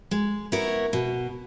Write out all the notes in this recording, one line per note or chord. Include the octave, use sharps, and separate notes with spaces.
G#3
B3 E4 A#4 C#5
B2